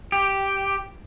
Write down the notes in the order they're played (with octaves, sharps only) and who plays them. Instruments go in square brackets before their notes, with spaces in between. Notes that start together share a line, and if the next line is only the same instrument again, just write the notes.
[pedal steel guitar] G4